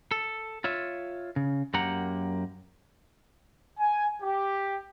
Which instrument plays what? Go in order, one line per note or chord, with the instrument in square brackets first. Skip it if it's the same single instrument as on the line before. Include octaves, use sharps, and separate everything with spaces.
[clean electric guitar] A4
F4 C#5 E5
C#3
F#2 A#3 G4 F#5 A#5
[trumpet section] G#5
G4